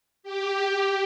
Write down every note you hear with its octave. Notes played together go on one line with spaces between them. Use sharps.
G4
G4